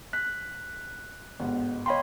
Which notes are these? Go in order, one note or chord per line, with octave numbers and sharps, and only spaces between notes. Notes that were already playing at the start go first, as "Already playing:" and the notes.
F#6 B6
G1 G#2 B2
C#5 D#5 F5 G5 B5 C6